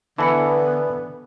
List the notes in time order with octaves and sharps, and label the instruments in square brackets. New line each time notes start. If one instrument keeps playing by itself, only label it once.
[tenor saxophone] D3 [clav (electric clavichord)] E3 E4 [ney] B3 [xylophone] A5 B5 C#7